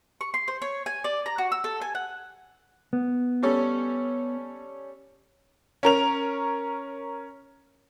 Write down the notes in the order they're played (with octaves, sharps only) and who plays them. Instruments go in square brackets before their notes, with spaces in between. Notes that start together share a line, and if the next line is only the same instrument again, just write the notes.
[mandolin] C#6
C6
C5
C#5
G#5
D5
A#5
F#4
E6
A4
G#5
F#5
[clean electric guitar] B3
[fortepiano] G3 C#4 A4
[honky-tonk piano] C#4 A#4 F7